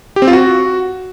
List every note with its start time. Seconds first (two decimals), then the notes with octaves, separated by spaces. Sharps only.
0.16 G4
0.22 C4
0.27 F4
0.33 F#4